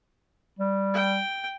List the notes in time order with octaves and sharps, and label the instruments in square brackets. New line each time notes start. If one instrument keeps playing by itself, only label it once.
[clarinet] G3
[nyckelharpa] G5